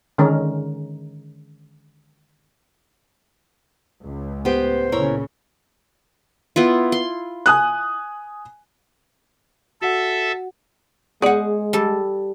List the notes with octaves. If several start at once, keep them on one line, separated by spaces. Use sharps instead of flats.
D3 D#3 G#3 C#4 A#4
C#2
A2 B3 G4 C5
A#2 C#3 E4 A#4 C#5
B3 E4 F4
C6
G#5 D#6 F#6
F#4 A4 E5 F#5
G#3 B3 G#4 D5 F#5
G3 A4